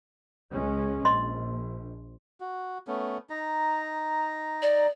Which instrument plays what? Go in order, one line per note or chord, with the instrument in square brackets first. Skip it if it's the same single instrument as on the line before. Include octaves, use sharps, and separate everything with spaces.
[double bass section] C#2 G#3 C#4
[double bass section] A#1 [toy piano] D#5 C6
[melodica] F#4
A3 B3 C#4
D#4 A#5
[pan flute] D5